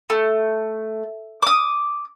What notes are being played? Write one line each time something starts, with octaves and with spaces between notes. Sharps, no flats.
A3
D6 D#6